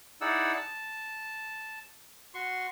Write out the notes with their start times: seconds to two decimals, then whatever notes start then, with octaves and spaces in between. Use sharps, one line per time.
0.21 D#4 E4 G#4 D5 F#5 E6
0.53 A5
2.34 F#4 C6 C#6